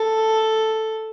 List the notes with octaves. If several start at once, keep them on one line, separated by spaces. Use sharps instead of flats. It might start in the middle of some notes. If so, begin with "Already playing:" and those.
Already playing: A4